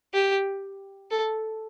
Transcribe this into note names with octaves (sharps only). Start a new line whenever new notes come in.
G4
A4